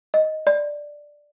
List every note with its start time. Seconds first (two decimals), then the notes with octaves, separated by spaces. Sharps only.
0.14 D#5
0.47 D5